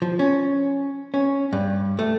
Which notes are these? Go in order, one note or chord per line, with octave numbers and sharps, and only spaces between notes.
F3
C#4
C#4
G2
A3